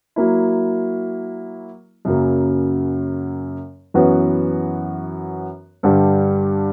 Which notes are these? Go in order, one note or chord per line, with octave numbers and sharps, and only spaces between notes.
F#3 A#3 E4
F#2 C#3 F#3 A#3
F#2 E3 B3 F#4 C#5
G2 D3 G3